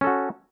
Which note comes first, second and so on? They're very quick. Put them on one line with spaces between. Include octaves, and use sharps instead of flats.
C#4 A4 F#4